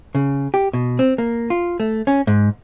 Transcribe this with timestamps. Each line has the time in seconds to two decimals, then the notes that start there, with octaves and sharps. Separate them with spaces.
0.15 C#3
0.54 G4
0.73 B2
0.99 C4
1.18 A#3
1.50 F4
1.80 A3
2.07 C#4
2.27 G#2